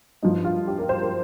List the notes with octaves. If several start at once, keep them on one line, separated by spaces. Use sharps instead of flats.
G2 F3 D#4
F4
G4
A#4
C5
A#4